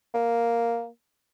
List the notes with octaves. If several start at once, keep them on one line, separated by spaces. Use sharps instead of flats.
A#3